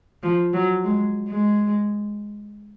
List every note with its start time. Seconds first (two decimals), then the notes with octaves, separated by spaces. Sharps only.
0.23 F3
0.54 F#3
0.84 G#3
1.29 G#3